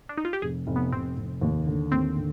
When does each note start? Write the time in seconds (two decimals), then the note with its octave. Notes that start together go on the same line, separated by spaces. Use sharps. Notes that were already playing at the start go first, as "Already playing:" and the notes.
0.09 D4
0.18 D#4
0.25 F4
0.33 G4
0.42 F1 G#4
0.67 F1
0.76 B3
0.92 F1 C4
1.17 F1
1.41 D#2
1.67 D3
1.92 D#2 C4
2.17 D3